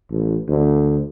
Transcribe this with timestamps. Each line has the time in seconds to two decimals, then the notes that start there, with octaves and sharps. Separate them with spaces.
0.10 A1
0.48 D2